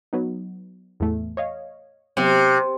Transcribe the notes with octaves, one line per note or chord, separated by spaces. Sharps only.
F#3 B3 D#4
E2 A2 A3
C#5 D#5 F5
C3 F#3 B3